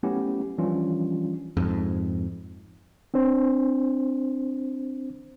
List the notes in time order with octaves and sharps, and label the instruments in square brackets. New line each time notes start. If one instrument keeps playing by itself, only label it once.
[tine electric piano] F#3 A3 B3 C#4 E4 G4
E3 F3 G3 C#4 D4 F4
[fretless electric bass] F2 G#2
[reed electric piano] C4 D4 C5